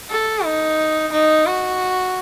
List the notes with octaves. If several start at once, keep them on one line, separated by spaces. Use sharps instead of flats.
A4
D#4
D#4
F#4